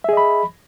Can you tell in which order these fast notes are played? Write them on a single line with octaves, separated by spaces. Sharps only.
E5 G#4 D#5 B5